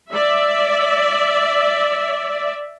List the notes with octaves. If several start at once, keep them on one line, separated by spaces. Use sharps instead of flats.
D5 E5